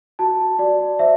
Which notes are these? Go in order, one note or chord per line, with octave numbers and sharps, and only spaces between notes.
F#4 A5
F#4 D5
C5 E5